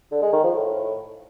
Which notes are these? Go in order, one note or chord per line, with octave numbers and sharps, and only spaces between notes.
D3
G#3
D#3
F3
A2